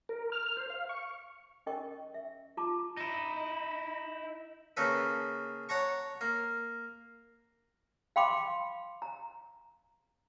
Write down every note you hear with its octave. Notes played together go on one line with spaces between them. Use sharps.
A#4
F6
C5
F5
C#6
C#4 A#4 D#5 G5 C#6
E5
F4 A5 A#5 C#6 D6
D#4 E4
C#3 A#3 A4 B4
C#5 F#5 A5 A#5 C#6
A#3
F5 G5 B5 C6 D6
A#5